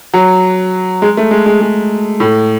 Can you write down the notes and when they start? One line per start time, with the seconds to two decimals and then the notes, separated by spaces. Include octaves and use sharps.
0.14 F#3
1.02 G#3
1.17 A3
1.31 G#3
1.46 G#3
1.61 G#3
2.20 A2